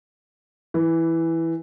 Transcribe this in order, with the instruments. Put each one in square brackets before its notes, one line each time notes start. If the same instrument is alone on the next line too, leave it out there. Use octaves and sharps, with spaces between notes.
[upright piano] E3